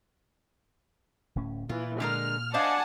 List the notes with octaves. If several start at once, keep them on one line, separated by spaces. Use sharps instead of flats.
D1 A2 C#4
A#2 E3 F4
D3 G#3 A#4 F6
D4 C5 D#5 F5 F#5 G#5 A5